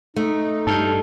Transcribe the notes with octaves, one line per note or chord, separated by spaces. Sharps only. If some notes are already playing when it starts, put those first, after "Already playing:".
A3 D#4
G2 A4 F6 G6